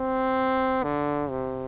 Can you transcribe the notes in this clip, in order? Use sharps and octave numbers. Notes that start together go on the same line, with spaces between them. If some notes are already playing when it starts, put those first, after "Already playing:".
Already playing: C4
D3
C3